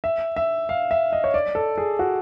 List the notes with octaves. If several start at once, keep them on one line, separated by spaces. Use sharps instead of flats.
E5
E5
F5
E5
D#5
C#5
D5
A4
G#4
F#4